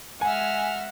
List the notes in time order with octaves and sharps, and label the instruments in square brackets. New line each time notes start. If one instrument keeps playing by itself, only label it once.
[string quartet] G#3 E5 F6 [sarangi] F#5 [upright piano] G#5